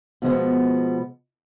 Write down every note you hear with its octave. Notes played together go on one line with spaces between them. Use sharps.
B2 F3 G#3 B3